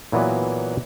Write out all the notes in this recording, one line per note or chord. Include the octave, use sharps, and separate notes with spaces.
A#2 E3 F#3 B3